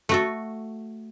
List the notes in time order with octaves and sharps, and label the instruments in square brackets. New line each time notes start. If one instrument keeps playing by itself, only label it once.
[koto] A3 F#4 A4